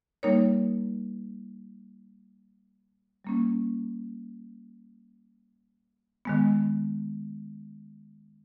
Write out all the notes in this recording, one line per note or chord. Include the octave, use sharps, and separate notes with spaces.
G3 A#3 D#4 A#4 C#5
G3 A#3 C#4
D#3 G#3 B3